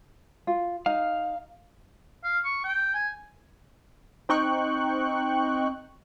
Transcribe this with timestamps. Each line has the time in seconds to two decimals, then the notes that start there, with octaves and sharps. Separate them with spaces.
0.47 F4
0.86 D#4 F5
2.24 F5
2.44 C#6
2.64 G5
2.94 G#5
4.29 C4 D#4 G5 C#6 F#6